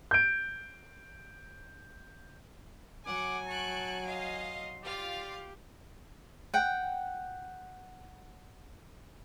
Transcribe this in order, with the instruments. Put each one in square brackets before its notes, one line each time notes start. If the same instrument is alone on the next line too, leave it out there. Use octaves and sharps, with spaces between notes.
[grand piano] G6 D7
[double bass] F#3 [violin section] F#5 [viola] G#5 [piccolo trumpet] D6
[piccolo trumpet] A5 [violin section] C#6 F#6 D7
[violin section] D#5 F5 [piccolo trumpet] C6
[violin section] F4 F5 [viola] G4 [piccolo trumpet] D5
[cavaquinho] F#5 G5